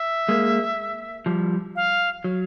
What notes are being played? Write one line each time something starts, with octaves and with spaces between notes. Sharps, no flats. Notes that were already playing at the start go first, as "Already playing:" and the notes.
Already playing: E5
G#3 A#3
F3 G3
F5
F#3